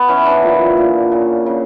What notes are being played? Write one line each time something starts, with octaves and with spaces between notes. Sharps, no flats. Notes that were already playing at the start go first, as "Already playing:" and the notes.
Already playing: B3
E3 C#4
D4
A#2
A#2
C#3
C#3